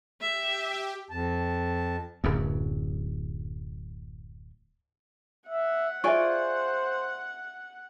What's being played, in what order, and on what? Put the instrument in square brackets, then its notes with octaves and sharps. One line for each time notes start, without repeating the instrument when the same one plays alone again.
[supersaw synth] G4 [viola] E5
[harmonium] F2 A5
[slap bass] D1 F#2
[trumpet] E5 [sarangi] F#5
[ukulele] F4 G#4 D5 [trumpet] C5 [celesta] E5 G#5 C#6